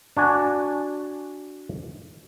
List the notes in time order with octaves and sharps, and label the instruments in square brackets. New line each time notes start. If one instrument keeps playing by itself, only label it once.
[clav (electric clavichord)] D4 F#4 G#5